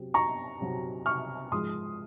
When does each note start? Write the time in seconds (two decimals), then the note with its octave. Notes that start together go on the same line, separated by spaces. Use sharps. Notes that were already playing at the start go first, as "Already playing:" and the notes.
Already playing: C3 F#3 C4
0.14 A#5 C#6
0.61 C3 F#3 C4
1.06 C#6 F6
1.52 G#2 F3 G#3 C6 D#6